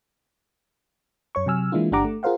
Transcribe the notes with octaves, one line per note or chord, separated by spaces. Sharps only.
F#2 C#5 C#6
C3 F#3 G#5 E6 F6
E3 G#3 A#3 D4 E4 F4
G1 D4 G4 F#5 A#5 D6
A3
F4 G#4 A#4 C5 F5 F#5